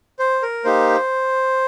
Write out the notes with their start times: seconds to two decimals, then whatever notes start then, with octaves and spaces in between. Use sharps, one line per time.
0.19 C5
0.42 A#4
0.64 A#3 D#4 G4 C5